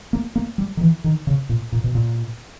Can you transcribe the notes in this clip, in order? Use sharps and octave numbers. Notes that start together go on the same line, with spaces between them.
A#3
A#3
G3
D#3
E3
D#3
C#3
A#2
A#2
B2
A#2